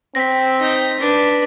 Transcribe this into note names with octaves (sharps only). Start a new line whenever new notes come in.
C4 A#6 B6
D#4
D4 B4